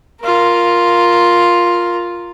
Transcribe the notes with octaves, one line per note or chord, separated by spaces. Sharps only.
F4 A#4